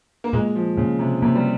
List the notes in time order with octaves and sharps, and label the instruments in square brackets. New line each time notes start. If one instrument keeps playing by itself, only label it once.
[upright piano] A#3
[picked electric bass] A#2 [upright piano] G#3
[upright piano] F3
[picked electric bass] A#2 [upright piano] C#3
[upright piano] C3
[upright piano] C3 [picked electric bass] A#3
[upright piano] G3